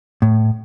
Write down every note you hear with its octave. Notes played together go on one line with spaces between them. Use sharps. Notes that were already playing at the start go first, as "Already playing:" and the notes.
A2